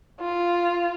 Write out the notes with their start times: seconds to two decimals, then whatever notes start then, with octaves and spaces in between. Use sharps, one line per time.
0.21 F4